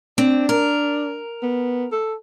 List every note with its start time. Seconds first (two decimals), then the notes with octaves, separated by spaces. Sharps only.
0.18 C4 D4
0.49 A#4
1.43 B3
1.92 A4